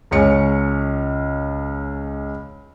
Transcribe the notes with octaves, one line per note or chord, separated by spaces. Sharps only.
C#2 C#4 C#7